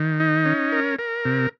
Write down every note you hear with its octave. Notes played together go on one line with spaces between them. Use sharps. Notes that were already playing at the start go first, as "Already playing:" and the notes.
Already playing: D#3
D#4
C#4
A#4
A#4
C3